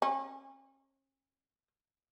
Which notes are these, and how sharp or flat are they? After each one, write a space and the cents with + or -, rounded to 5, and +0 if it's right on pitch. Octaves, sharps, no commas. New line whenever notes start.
C#4 -40